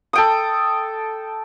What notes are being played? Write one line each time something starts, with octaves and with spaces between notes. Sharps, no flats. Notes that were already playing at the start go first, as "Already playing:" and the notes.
A4 G5 D#6